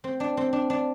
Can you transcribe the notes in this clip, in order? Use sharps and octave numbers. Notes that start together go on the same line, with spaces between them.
C4
D4
C4
D4
D4